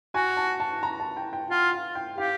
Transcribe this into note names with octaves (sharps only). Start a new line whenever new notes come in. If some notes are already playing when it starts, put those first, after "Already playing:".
F#4 G#5
A5
A5
A#5
A5
G5
G5
F4 F#5
F5
G5
G4 F5